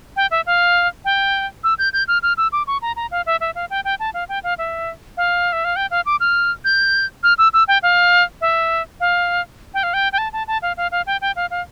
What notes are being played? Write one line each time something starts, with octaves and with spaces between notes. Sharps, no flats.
G5
E5
F5
G5
E6
G6
G6
F6
F6
E6
D6
C#6
A#5
A#5
F5
E5
E5
F5
G5
G5
A5
F5
G5
F5
E5
F5
E5
F5
G5
F5
D6
F6
G6
F6
E6
E6
G5
F5
E5
F5
G5
F5
G5
G5
A5
A5
A5
F5
F5
F5
G5
G5
F5
F5